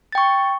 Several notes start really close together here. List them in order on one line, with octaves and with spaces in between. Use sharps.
A6 G5 C#6